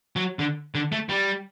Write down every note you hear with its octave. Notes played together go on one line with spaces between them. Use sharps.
F#3
D3
D3
A3
G3